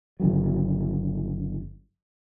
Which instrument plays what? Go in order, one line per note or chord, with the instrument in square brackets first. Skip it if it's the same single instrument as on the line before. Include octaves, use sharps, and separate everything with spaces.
[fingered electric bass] G1 C#3 F#3